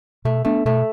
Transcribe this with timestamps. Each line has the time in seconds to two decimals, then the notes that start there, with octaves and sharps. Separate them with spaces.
0.25 B2 A3
0.45 A3 B3 D4
0.65 B2 A3